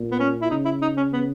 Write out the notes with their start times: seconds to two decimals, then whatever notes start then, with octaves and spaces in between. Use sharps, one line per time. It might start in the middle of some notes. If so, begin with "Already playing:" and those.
Already playing: A#2
0.11 B3
0.19 C#4
0.42 E4
0.50 C#3 D#4
0.65 E4
0.82 D#4
0.97 C#4
1.13 B3